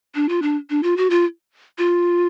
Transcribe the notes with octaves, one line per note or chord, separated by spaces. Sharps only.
D4
F4
D4
D4
F4
F#4
F4
F4